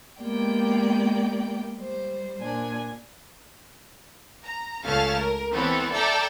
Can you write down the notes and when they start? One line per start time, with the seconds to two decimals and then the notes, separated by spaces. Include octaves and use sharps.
0.21 G#3 A#3 B3 G4 D5 G5
1.78 G3 C5
2.41 A#2 D4 G#5
4.43 A#5
4.85 C#2 A3 C#4 F5 A5 F6
5.15 A#4
5.51 E3 B3 C4 A4 C#5
5.92 A4 D5 E5 G5 A5 A#5